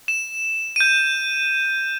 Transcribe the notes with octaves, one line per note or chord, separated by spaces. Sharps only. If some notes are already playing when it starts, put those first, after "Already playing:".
E7
G6 D#7